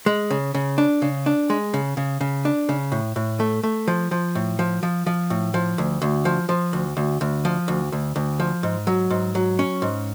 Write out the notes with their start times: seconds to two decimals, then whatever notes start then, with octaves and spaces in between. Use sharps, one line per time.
0.06 G#3
0.30 C#3
0.54 C#3
0.78 D4
1.02 C#3
1.26 D4
1.50 G#3
1.74 C#3
1.97 C#3
2.21 C#3
2.45 D4
2.69 C#3
2.92 A2
3.16 A2
3.40 A3
3.63 A3
3.88 F3
4.11 F3
4.35 A2
4.59 F3
4.83 F3
5.06 F3
5.30 A2
5.54 F3
5.78 D2
6.02 D2
6.25 F3
6.49 F3
6.73 D2
6.97 D2
7.21 D2
7.45 F3
7.68 D2
7.92 D2
8.16 D2
8.40 F3
8.63 G#2
8.87 F#3
9.10 G#2
9.35 F#3
9.59 C#4
9.82 G#2